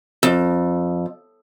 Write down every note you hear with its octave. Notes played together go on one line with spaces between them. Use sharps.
F2